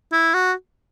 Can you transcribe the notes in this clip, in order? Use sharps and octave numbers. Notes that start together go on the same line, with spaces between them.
E4
F#4